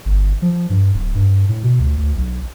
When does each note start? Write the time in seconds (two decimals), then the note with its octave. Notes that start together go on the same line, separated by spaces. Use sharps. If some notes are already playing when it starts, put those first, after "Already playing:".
0.05 G1
0.42 F3
0.70 G2
0.94 D1
1.15 G2
1.49 A2
1.63 B2
1.80 D2
1.97 D2
2.16 B1